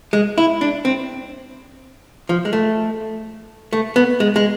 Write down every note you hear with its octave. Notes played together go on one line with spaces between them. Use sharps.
G#3
E4
D4
C4
F3
G#3
A3
A3
B3
G#3
G#3